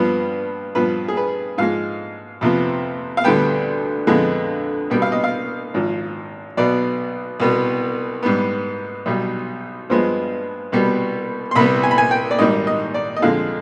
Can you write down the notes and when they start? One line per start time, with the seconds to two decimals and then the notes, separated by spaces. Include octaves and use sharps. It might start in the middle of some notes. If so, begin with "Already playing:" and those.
Already playing: G2 F3 B3
0.75 G2 F3 B3 B4
1.08 G#4
1.17 B4
1.58 G#2 F3 G#3 F5
2.41 F2 C3 F3 B3
3.17 F5
3.24 D2 D3 G3 B3 G5
4.07 F2 D3 G#3 B3
4.90 C2 B2 G3 B3 G5
5.02 F5
5.12 D#5
5.24 F5
5.74 G#1 G#2 F3
6.57 B1 B2 B3 D5
7.40 C2 B2 B3
8.23 G#2 G3 B3
9.06 B1 B2 G3
9.90 G2 F3 G#3 B3 C5
10.72 C2 B2 G3 B3
11.51 C6
11.55 C2 C3 G3 B3 B5
11.83 G#5
11.91 B5
11.98 G#5
12.11 G5
12.31 D5
12.39 G#1 G#2 D#3 G3 D#5
12.67 D#5
12.94 D5
13.17 D#5
13.22 F2 D3 F3 G#3 F5